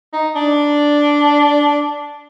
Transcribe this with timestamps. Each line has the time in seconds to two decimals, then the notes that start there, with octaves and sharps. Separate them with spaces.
0.13 D#4
0.35 D4